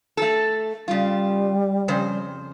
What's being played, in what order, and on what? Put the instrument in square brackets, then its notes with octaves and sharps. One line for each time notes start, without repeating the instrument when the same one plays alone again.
[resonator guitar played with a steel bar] A3 A4
[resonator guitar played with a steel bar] C#3 F4 [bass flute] G3
[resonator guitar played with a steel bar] F2 C#3 C5